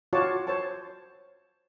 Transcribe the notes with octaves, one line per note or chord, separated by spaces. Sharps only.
F4 F#4 C#5 D5 A5
C5 C#5 A5